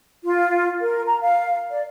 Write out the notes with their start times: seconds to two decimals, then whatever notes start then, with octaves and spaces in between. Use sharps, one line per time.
0.24 F4
0.82 A#4
1.06 A#5
1.21 F5
1.70 D5